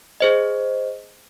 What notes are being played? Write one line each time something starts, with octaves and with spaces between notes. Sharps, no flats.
G#4 C5 D#5